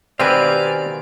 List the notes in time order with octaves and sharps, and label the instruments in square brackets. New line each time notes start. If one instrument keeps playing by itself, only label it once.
[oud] B2 D#3 G4 [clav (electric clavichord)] C4 B4 [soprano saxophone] D5 [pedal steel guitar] F5 G#5